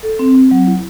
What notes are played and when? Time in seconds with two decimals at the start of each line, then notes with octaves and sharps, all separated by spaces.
0.03 A4
0.19 C4
0.35 C4
0.51 F#3
0.67 E4